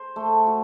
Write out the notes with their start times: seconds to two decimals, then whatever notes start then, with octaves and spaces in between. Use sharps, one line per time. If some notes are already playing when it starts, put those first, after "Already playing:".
Already playing: C5
0.16 A3
0.47 F#4